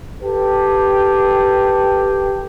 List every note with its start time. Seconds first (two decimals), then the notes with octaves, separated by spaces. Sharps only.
0.23 G4 A4 B4 G5